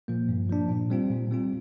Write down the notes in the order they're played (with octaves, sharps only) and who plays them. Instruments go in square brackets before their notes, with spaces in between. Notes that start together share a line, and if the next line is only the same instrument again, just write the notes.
[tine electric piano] A#2 F3 A#3
G2
F3 A#3 D4
A#2
G3 C4 F4
A#2
G3 C4 F4